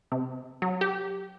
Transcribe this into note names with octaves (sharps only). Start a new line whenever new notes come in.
C3
F#3
G4